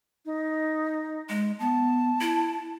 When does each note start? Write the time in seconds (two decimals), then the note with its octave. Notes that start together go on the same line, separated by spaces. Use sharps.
0.26 D#4
1.29 G#3
1.60 B3 A5
2.21 E4